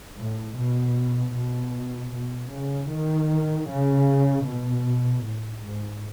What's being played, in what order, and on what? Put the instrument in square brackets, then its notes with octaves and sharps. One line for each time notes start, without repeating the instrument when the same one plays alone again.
[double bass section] A2
B2
B2
B2
C#3
D#3
C#3
B2
A2
G#2